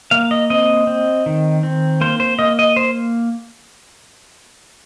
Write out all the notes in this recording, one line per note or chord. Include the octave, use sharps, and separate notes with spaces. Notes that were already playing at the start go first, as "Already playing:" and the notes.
A#3 F5
D#5
C4 D#5
C4
D#3
C4
A#3 C5
C5
A#3 D#5
D#5
C5